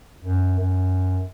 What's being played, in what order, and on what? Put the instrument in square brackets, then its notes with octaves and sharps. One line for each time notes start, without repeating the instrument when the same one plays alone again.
[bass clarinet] F#2
F#2